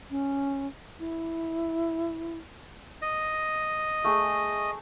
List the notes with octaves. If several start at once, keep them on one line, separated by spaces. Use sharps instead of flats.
C#4
E4
D#5
A3 G#4